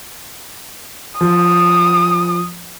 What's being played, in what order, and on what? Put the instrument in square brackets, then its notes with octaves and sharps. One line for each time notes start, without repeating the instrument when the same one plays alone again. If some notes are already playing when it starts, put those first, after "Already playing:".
[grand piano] F3 [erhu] D#6